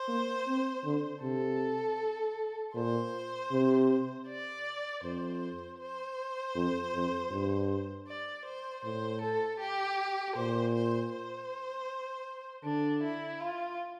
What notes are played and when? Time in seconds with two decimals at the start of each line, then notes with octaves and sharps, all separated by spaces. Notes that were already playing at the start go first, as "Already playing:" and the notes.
Already playing: C5
0.08 A#3
0.47 C4
0.85 D3
1.22 C3 A4
2.75 A#2 C5
3.52 C3
4.28 D5
5.03 F2 C5
5.79 C5
6.55 F2
6.94 F2
7.31 G2
8.08 D5
8.45 C5
8.84 A2 C5
9.22 A4
9.60 G4
10.36 A#2 C5
10.74 C5
11.13 C5
12.64 D3 D4
13.03 E4
13.40 F4